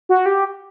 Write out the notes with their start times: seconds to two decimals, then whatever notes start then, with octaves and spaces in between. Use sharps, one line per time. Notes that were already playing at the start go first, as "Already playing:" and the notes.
0.09 F#4
0.26 G4